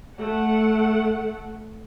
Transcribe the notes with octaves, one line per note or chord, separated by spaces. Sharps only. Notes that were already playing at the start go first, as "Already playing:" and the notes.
A3 F#5